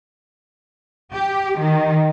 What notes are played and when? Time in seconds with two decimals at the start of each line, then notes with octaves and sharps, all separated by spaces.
1.14 G4
1.58 D#3